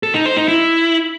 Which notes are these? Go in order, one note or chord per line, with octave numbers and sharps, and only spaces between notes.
A4
D#4
C5
D#4
E4